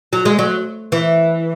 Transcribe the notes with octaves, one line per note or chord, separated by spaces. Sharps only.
F#3
G#3
F#3
E3